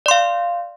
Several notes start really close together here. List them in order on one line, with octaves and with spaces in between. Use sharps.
D5 C6 F5